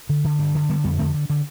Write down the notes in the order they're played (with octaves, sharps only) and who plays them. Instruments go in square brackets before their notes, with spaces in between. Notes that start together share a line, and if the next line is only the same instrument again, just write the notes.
[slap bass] D3
D3
G2
D3
D3 G3 B3
F2 G3 B3
D3 A3 C4
D3
D3